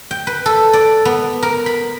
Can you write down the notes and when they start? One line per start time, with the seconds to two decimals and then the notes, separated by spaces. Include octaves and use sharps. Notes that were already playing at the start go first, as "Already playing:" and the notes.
0.11 G5
0.27 B4
0.46 A4
0.73 D5
1.05 B3
1.43 A#4
1.66 B5